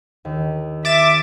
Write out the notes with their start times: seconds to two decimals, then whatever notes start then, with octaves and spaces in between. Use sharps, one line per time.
0.25 D#2
0.85 E5 D6 A6 E7